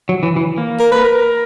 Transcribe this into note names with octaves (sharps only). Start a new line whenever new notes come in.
F#3
E3
E3
A#3
A#4
B4
A#4